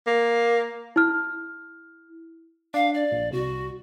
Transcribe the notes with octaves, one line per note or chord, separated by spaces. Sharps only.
A#3
E4 F6
D4 F5
D5
A#1
C2 F#4